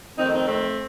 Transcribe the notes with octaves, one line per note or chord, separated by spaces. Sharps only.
F2 D#3 A3 C4 D#4
C4 D#4
A3 C4